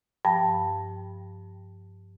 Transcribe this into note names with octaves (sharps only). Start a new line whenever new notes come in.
G2 F3 G5 A5